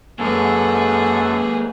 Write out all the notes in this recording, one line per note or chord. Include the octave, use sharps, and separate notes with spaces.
F#2 G#3 A#3 G#4 A4 B4